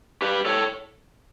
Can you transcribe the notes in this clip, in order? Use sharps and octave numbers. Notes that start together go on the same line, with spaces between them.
G4 B4
A4 C#5